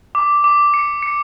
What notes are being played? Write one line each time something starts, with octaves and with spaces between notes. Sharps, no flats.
D6
D6
C#7
C#7